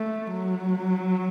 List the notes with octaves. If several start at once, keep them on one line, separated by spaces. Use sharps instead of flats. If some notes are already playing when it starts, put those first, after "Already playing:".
Already playing: A3
F#3